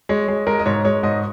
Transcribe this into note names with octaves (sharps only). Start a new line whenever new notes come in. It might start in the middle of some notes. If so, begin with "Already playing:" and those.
G#3 C#5
G#3
G#3 A#4
D#5
G#2 C#5
G#3 C#5
G#2 D#5